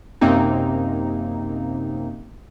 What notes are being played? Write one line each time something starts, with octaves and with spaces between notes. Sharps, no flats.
F#2 C3 A#3 C4 D#4